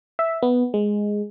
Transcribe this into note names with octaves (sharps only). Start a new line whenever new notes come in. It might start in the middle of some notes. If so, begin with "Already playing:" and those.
E5
B3
G#3